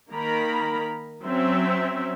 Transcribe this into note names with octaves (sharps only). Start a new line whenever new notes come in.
D#3 A#3 A#4 A#5 B5
F#3 C4 C#4 E5